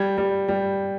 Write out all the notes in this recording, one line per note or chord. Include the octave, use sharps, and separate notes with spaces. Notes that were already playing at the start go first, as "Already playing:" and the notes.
Already playing: G3 G#6
G3
G3